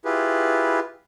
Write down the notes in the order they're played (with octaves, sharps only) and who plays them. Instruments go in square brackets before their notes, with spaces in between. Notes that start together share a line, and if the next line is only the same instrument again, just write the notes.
[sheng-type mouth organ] E4 F4 G4 G#4 B4